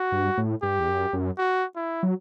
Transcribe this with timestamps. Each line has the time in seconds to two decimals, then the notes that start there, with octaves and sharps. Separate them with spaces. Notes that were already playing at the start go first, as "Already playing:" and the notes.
Already playing: F#4
0.12 G2
0.38 A2
0.62 G2 G4
0.79 E2
0.88 F#2
1.13 F#2
1.38 F#4
1.76 E4
2.03 F#3